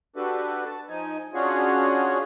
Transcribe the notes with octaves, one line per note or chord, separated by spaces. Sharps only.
D4 F#4 G4 A4 B4
A5
F3 D#4 G#5
C#4 D4 F4 F#4 G#4 C#5